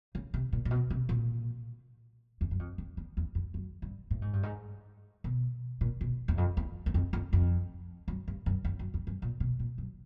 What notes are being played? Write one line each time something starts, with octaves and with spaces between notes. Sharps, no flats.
C#3
C3
A#2
A#2
B2
C3
A#2
E2
F#2
F2
F2
E2
E2
F2
F#2
G2
A2
G#2
G2
G#2
B2
A#2
B2
E2
F2
E2
E2
F2
F2
F2
F#2
G2
F#2
F2
F#2
E2
F#2
A#2
B2
A#2
F#2